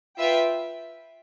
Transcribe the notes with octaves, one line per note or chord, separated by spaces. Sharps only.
F4 B4 E5 G5